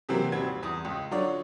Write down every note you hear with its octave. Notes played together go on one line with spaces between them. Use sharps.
C3 E3 F#3 A#3 C4
D#1 G3 C4 F#4 G#6
E2 D#6
C#2
D3 F#3 F4 F#4 C#5 D5